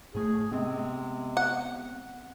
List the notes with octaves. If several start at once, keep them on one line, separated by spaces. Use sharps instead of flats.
G#2 A3 G#4
C3 G#3 B3 C4
F#5